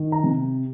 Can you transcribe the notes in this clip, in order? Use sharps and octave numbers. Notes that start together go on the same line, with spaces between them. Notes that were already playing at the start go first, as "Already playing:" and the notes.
Already playing: D#3
A#5
C3